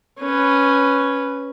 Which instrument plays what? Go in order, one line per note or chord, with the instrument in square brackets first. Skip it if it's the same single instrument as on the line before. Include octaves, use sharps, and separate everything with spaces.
[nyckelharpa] C#4 B4